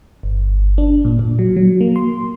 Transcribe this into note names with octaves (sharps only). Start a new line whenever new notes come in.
G1
D4
A#2
A#2
F#3
F#3
A#3
C6